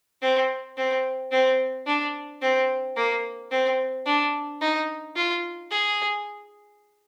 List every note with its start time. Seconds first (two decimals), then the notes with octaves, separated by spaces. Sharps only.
0.22 C4
0.77 C4
1.32 C4
1.87 D4
2.42 C4
2.96 A#3
3.51 C4
4.06 D4
4.61 D#4
5.16 F4
5.71 G#4